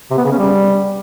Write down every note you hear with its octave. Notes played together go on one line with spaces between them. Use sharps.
C3
B3
C#3
C#4
G3